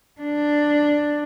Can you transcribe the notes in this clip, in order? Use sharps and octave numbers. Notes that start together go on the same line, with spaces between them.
D4